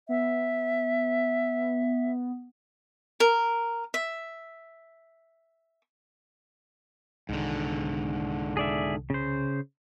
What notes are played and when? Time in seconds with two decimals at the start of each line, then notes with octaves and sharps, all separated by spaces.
0.09 B3 E5
3.20 A#4
3.94 E5
7.29 C2 G#2 D3 D#3
8.57 G#4 D5 E5
9.10 C#3 C5